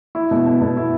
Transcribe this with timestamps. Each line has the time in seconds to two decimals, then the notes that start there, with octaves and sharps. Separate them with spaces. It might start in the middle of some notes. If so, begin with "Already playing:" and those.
0.15 E4
0.31 B2
0.46 B2
0.61 B2
0.77 E4